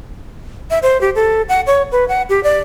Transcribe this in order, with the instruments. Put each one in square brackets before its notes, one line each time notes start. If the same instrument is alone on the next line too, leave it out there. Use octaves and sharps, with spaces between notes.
[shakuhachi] E5
C5
G4
A4
F#5
C#5
B4
F#5
G4
D5